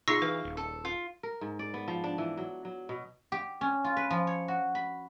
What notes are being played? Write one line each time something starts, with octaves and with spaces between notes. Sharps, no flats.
B2 D#4 F4 G#4 C6 C#6 E6 A#6
E3 B4 F5
D#1
A4
F4
A#4
G#2
D5
B3
F3
D4
E3
F#3
F#3
B2
G4
C#4
F4
B4
F3
C#5
F#4
B5